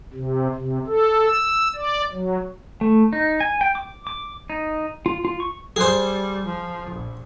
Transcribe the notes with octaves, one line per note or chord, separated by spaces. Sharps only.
C3
C3
A4
E6
D5
F#3
A3
D#4
G#5
G5
D6
D6
D#4
F4
F4
C#6
G3 G#4 C5
F3
A#1